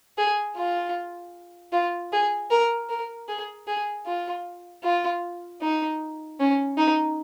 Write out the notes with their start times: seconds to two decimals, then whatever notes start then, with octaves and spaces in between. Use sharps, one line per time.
0.18 G#4
0.57 F4
1.72 F4
2.12 G#4
2.51 A#4
2.90 A#4
3.28 G#4
3.67 G#4
4.06 F4
4.84 F4
5.61 D#4
6.40 C#4
6.78 D#4